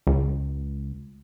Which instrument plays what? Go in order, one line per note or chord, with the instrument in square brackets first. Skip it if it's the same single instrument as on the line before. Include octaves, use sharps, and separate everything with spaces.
[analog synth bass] C#2